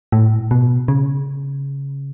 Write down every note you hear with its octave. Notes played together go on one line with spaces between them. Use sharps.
A2
B2
C#3